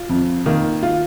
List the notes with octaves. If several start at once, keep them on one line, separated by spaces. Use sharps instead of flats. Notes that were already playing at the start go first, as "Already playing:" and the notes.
Already playing: F4
F2
D#3 A#3
F4